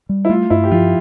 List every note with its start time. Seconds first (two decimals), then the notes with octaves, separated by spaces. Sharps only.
0.09 G3
0.25 E4
0.29 A3 F4
0.50 G2 E4
0.64 G4
0.71 F3 F4